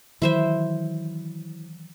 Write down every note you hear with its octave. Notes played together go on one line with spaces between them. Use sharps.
D#3 E3 F#3 E4 C5 E5